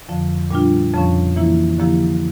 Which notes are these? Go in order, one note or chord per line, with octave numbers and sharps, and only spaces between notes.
F2 D3 F3
A#2 G3 D4 F4
F2 C#3 F3 C#4
E3 A#3 E4
D3 F3 A#3 E4 G4